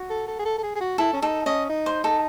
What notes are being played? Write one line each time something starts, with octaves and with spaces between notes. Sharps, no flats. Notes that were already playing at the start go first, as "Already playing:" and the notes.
Already playing: F#4
A4
A4
G#4
A4
A4
G#4
G#4
F#4
E4 A4
C#4
D#4 A4
C#4 D#5
D#4
C5
D#4 A4